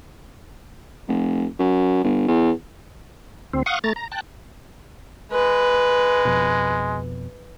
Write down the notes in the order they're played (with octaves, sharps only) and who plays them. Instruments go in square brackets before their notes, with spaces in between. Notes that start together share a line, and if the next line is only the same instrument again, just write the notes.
[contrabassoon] F1
F#2
G1
E2
[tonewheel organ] D2 C4
F5 F#5 C#6 D#6
A3 A#5 A6
A#5
G5 A5 F#6
[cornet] G#3 [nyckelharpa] B4
[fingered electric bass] F2 B2